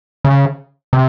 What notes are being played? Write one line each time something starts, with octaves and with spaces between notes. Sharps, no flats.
C#3
C3